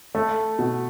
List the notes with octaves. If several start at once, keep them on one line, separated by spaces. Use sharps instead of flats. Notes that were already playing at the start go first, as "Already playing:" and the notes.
A3
B2